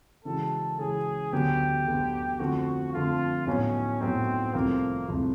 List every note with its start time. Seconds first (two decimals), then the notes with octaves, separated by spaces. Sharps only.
0.25 C#3 E3 G#3 C#4 F#4 A4
0.78 C#3 E3 G#3 C#4 F#4 G#4
1.32 D2 D3 F#3 B3 G4
1.86 D2 D3 F#3 B3
2.39 F2 D3 F3 A3 F#4
2.93 F2 D3 F3 A3 F4
3.47 A2 F#3 B3 C#4 D#4
4.01 A2 F#3 B3 C4 D#4
4.54 C2 C3 F3 A3 A#3
5.07 C2 C3 F3 A3